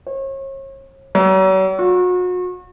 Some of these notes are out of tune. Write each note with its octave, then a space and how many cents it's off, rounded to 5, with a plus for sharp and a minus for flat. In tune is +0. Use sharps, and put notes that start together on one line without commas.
C#5 -40
F#3 +40
F#4 -35